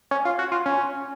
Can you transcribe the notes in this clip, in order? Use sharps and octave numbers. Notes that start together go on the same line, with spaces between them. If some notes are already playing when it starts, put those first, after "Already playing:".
C#4
F4
F#4
F4
C#4